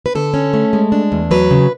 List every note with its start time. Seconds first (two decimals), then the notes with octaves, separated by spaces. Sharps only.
0.06 B4
0.15 D3 A4
0.34 C#4
0.54 A3
0.73 G#3
0.92 D4
1.12 E2
1.31 F#3 B4
1.51 C#3